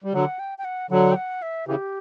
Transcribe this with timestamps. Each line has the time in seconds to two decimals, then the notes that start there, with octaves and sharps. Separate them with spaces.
0.04 G3
0.13 D3 F#3 F#5
0.39 G5
0.58 G5
0.65 F#5
0.90 D3 F#3 F#5
1.12 G5
1.16 F#5
1.42 E5
1.67 C#3 E3 G4